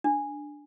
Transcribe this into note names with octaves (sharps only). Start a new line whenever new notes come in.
D4